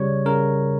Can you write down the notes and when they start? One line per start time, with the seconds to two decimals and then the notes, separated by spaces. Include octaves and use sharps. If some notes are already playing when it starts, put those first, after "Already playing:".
Already playing: C#3 G3 C#5
0.25 C#3 A#4